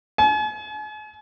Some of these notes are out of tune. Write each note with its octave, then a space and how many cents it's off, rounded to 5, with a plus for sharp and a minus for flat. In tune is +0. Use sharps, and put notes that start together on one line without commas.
G#5 +40